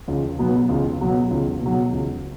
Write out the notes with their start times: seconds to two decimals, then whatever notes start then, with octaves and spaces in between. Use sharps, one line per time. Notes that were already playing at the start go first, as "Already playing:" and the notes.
0.08 C#2
0.39 B2 F#3 B3
0.69 C#2
1.00 B2 F#3 B3
1.31 C#2
1.62 B2 F#3
1.92 C#2